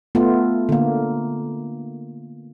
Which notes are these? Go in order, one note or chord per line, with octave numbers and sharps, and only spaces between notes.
A3 B3 F4
D3 A#3